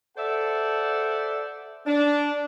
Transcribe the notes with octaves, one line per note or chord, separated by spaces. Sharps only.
A4 C5 D5 E5 F#5
D4